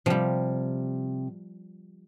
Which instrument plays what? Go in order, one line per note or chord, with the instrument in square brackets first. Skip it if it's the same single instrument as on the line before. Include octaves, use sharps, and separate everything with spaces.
[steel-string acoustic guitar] C3 [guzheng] F3 G3